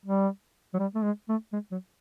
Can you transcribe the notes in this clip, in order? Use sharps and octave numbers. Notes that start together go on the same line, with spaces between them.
G3
F#3
G3
A3
G#3
A3
G#3
F#3